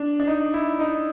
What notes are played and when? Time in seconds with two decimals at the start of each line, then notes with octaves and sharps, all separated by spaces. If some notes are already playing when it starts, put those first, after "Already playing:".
Already playing: D4
0.20 D4
0.27 D#4
0.54 E4
0.79 D#4